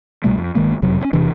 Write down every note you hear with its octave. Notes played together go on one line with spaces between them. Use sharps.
C2 B2 G3 A3
F2
G1 D#3 G#3 A#3
F#1 F2 C3 F#3
C3 C#4
E1 C3 E3 D4